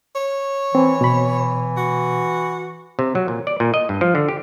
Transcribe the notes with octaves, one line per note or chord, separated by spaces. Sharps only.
C#5
E3 C4
B2 B5
F#4
C3
F#3
A#2
D5
A#2
D#5
G2
F3
D3
G4